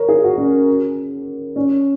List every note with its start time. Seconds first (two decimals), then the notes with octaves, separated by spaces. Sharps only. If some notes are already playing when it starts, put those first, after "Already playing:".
Already playing: A#4 C#5
0.09 G#4
0.24 F#4
0.38 C#4
1.56 C#4